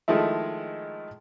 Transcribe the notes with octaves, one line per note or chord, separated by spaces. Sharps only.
D#3 F3 G#3 A3 E4